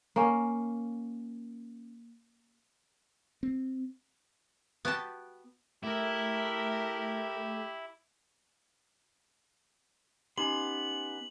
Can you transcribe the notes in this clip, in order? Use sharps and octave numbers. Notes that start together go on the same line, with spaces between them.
A#3 C#4
C4
B3 F#4 G4 G5 A5
A3 E4 G4 A#4 E5
B3 C#4 D#4 G4 C6 F#7